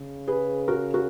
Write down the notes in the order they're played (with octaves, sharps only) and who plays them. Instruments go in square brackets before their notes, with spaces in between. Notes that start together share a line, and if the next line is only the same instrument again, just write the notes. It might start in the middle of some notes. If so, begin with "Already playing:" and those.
Already playing: [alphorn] C#3
[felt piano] G#4 B4
F#4 A#4
F#4 A#4